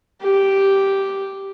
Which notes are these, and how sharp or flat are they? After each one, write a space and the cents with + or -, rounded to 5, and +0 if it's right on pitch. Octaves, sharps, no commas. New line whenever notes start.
G4 -5